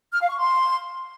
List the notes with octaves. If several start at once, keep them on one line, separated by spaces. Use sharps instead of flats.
F6
F5
C#6
C6